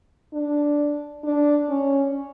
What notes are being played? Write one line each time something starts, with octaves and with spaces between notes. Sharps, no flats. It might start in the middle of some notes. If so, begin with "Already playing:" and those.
D4
D4
C#4